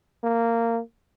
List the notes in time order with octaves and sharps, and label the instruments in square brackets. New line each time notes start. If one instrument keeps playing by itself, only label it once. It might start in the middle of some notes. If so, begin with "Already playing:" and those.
[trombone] A#3